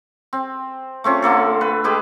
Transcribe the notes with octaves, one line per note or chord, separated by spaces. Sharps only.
C4
A3 C4 C#4 F4
D3 A3 A#3 A4
B4
G#3 G4 B4